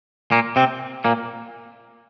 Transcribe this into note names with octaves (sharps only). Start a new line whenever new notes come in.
A#2 A#3
C3 C4
A#2 A#3